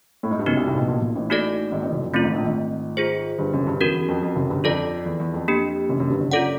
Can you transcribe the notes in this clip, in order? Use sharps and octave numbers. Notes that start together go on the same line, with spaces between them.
A2
G#2
G2
F#1 F#2 B3 D#4 F#4
C2 C3
C2 C3
A#2
B1 B2
A#1 A#2
A#1 A#2
A1 A2
A#3 D#4 F#4 A4 D5
G#1 G#2
A1 A2
F#1 F#2
F2
F#1 F#2 A3 C4 F4
G#1 G#2
A#1 A#2
G#1 G#2
F4 G#4 C5
G1 G2
F#1 F#2
G1 G2
E2 C#4 F#4 A#4
E2
F2
F2
F#1 F#2
G1 G2
F2 F4 A4 D5
E2
E2
F2
A#3 D4 G4
F#1 F#2
F#1 F#2
G1 G2
F#1 F#2
F4 A4 D5 F#5